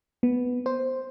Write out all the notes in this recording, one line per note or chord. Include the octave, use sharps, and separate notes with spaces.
B3
C5